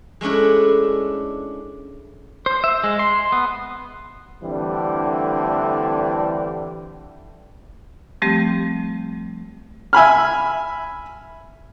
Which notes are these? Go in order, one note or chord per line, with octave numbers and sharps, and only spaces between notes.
G#3 A3 C#4 D4 E4
C5
E5
G#3
C6
B3
D3 E3 G3 A3 C4 D4
F3 G3 A3 C4 G4
E5 G#5 B5 F6